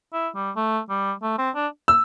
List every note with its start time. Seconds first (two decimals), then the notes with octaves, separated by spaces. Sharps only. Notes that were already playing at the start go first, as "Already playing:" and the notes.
0.13 E4
0.35 G3
0.57 A3
0.90 G3
1.22 A3
1.39 C4
1.55 D4
1.88 E6